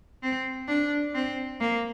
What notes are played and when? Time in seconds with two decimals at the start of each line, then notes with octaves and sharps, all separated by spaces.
0.23 C4
0.68 D4
1.14 C4
1.61 A#3